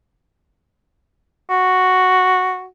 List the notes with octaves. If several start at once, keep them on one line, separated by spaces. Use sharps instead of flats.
F#4